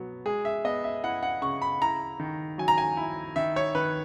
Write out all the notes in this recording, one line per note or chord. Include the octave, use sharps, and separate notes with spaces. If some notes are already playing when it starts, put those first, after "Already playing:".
Already playing: B2 F#3 B3
G#3 G#4
E5
B3 D#5
E5
E4 F#5
F#5
C#3 C#6
B5
E4 A#5
D#3
F#3 G#5
A#5
G#5
E4
D#3 E5
C#5
D#3 B4